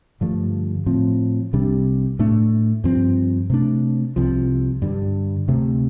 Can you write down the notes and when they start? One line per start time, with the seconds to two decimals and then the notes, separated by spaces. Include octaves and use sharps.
0.21 G2 D3 F3 A3
0.86 A2 F3 C4
1.53 C2 C3 G3 D4
2.19 A2 A3 D4
2.84 G2 F3 C4
3.50 C3 A3 D4
4.16 C2 C3 F3
4.82 G2 D3 G3
5.48 D2 C3 A3